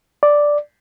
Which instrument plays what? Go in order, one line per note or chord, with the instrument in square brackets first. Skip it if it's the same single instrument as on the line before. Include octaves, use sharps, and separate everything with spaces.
[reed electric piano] D5